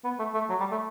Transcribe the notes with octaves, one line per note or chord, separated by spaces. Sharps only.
B3
A3
A3
F#3
G3
A3